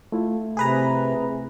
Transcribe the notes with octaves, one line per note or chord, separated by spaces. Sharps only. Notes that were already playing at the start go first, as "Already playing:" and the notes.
A3 E4 F4
C3 G#4 B4 A#5